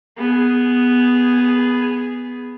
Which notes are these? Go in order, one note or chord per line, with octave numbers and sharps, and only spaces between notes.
B3 G#4